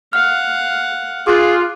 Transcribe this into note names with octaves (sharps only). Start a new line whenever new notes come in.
F5 F#5 F6
F4 G#4 D6 F#6